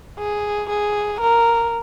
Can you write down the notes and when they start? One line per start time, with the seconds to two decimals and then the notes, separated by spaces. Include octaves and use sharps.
0.19 G#4
0.70 G#4
1.21 A#4